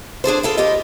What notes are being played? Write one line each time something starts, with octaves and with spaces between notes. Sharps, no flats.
D4 G#4 A4 C5
E4 F4 A4
E4 F4 G4 D#5